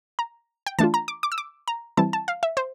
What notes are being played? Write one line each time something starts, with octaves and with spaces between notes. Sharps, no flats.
A#5
G5
E3 A3 D4 F4 A5
A#5
D6
D6
E6
D6
A#5
E3 G3 C4 E4 A5
A5
F5
E5
C5